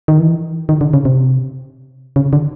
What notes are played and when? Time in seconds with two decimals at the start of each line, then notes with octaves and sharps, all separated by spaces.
0.08 D#3
0.20 E3
0.69 D#3
0.81 D3
0.94 C#3
1.05 C3
2.16 C#3
2.33 D3